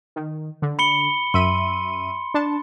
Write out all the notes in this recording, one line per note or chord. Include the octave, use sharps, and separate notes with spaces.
D#3
D3
B5 C#7 G7
F#2 E5 C6 D#7
D4 A5